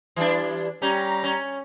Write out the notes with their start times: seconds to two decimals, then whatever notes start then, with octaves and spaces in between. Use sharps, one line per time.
0.16 E3 G3 D4
0.82 G3 C#4 A#5
1.23 C#4